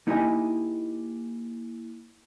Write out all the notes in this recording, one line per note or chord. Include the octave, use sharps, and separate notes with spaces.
A#3 D#4 E4 G4 D#5 G#5